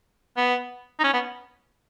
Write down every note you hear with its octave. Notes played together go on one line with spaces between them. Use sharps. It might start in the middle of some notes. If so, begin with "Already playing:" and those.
B3
D#4
C#4
B3